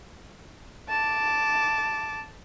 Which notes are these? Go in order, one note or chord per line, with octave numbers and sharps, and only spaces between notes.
A5 D6